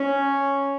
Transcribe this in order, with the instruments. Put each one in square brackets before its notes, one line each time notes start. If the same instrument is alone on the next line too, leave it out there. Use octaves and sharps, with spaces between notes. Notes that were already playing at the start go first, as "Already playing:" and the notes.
Already playing: [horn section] C#4